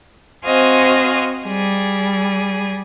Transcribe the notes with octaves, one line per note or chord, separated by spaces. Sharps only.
C4 F#4 C5 D#5 F5 G#5
G3 G#4